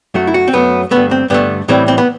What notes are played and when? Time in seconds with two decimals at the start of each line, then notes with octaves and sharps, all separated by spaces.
0.14 F#2 F#3 A3 F#4
0.27 E4
0.34 F#4
0.48 C4
0.53 F#2 F#3 A3 B3
0.91 G2 D3 A3 B3
1.11 C4
1.30 G2 D3 A3 B3
1.68 A2 E3 G3 C4
1.88 C4
1.98 B3